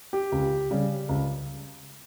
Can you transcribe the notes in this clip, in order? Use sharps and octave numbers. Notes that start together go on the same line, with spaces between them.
G4
C#2
C#3 G3
C#2